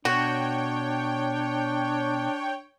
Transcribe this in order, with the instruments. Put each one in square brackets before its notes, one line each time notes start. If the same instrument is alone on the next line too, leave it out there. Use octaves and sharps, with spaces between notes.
[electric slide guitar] B2 [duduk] D4 [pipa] F#4 [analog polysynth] C#5 G5